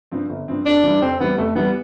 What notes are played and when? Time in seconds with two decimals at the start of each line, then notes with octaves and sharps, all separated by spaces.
0.12 G2 F3 C4
0.30 G1
0.48 G2 F3 C4
0.66 F2 D4
0.84 E3 G3
1.02 F2 C4
1.20 E3 G3 B3
1.38 F2 A3
1.55 E3 G3 B3